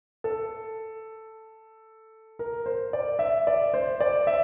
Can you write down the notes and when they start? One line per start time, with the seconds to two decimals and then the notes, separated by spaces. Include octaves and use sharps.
0.24 A4
2.39 A#4
2.66 C5
2.93 D5
3.19 E5
3.47 D5
3.74 C5
4.01 D5
4.27 E5